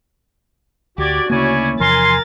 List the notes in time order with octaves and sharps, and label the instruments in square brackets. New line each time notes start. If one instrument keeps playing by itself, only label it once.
[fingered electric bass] D2 [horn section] F#4 [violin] G4 G#6 [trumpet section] D5
[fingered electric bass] D2 C#3 A#3 [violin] C#4 E4 [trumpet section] C#5 D5 G#5
[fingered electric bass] E2 C3 F3 [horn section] A#4 G#5 [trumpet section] C6 [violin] A6